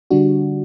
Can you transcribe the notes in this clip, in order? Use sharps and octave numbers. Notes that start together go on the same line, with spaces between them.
D3 G3 D4 F#4